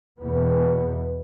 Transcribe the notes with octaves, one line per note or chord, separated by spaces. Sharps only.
E2 B2 B3